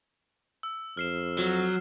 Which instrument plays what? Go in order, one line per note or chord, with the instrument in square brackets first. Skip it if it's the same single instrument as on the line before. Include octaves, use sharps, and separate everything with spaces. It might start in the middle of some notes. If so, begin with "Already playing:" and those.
[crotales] E6
[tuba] F2 [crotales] F6 C7 E7
[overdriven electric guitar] F#3